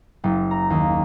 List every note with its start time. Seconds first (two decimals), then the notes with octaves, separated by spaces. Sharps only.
0.24 F#1
0.51 A#5
0.70 D#2